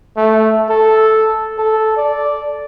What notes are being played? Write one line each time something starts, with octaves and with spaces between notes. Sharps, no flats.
A3
A4
A4
D5